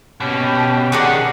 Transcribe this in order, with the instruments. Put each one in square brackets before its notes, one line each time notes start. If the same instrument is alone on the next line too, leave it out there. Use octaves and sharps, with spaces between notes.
[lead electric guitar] B2 [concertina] C#4 G4 G5
[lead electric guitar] D#3 D4 [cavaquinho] G#4 A#4 D6 [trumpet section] F#5